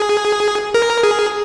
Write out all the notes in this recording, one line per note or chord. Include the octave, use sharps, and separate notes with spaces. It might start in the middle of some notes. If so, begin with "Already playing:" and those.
Already playing: G#4
A#4
G#4